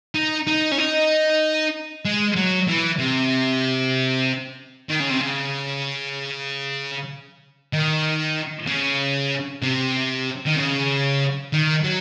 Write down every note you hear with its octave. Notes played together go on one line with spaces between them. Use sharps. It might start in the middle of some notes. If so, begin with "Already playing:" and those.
D#4
D#4
C#4
D#4
G#3
F#3
E3
C3
D#3
C#3
C3
C#3
D#3
C#3
C3
D#3
C#3
D#3
F#3